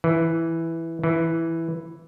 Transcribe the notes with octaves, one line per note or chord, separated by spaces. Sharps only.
E3
E3